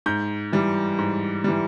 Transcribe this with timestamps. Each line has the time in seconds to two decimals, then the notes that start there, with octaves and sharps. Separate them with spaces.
0.06 G#2 G6
0.52 E3 G3
0.98 G#2
1.44 E3 G3